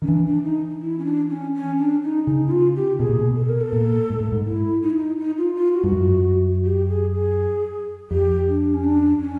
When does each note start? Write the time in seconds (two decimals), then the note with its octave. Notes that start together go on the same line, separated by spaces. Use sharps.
0.02 D#3 C#4
0.08 E3 D4
0.26 D4
0.44 D#4
0.82 E4
0.99 C#4
1.05 D4
1.30 C#4
1.55 C#4
1.78 D4
2.03 D#4
2.27 C#3 D#4
2.47 E4
2.51 F4
2.76 G4
2.99 B2 G#4
3.09 A#2
3.20 B2
3.36 A4
3.49 A#4
3.61 A4
3.72 A#2
4.10 G#2
4.20 A2
4.32 G#2
4.46 E4
4.83 D#4
4.90 E4
4.97 D#4
5.19 D#4
5.37 F4
5.56 F4
5.73 F#4
5.83 G2
5.92 F#2
6.65 G4
6.89 G#4
7.13 G#4
8.10 F2 G4
8.47 D4
8.74 C#4
8.84 D4
9.20 C#4